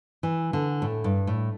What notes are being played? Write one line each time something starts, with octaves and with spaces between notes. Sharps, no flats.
E3
D3
A2
G2
A2